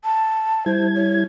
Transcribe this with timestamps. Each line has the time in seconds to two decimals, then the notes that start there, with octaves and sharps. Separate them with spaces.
0.04 A5
0.66 G3 E4 C5 G#6
0.95 C#5